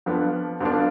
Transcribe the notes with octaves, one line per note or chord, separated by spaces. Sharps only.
F2 F3 B3 D4
F2 F3 B3 D4